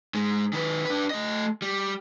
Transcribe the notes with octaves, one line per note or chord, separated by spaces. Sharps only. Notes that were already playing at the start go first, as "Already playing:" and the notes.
G#2 G#3
D#3 B4
D4 B4
A3 D#5
G3